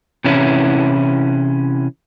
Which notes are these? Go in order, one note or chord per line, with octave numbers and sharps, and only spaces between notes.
C3 E3 C#4 E4